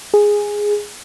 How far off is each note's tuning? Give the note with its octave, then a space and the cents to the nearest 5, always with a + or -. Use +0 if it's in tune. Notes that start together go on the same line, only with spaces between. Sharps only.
G#4 -5